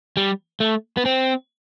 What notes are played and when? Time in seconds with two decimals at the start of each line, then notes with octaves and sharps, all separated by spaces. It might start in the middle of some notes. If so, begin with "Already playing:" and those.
0.17 G3
0.60 A3
0.97 B3
1.05 C4